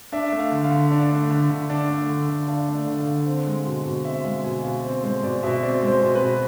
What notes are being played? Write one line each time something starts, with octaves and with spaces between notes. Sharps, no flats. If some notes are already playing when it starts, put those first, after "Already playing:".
D4 E5
A3
F5
D3
F5
D3
D4
A3
D3
D3
D4
A3
D3
D3
D4 F5
A3
D5
D3
F5
D3
C4
G#3
B2
B2
C4 E5
G#3 F5
B2 G#5
B2 F5
C4
G#3 C5
B2 D5
B2 E5
C4 D5
G#3
C5
B2
B4
B2